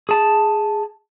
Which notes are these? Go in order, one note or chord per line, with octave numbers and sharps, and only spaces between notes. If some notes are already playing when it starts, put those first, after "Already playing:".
G#4 A5